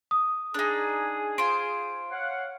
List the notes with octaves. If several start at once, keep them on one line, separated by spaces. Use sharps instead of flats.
D#6
D4 D#4 G#4
F4 C5 D7
C#5 F5 F#5